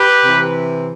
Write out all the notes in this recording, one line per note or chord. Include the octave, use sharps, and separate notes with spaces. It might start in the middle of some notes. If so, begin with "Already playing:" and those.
Already playing: G4 B4
C3 E3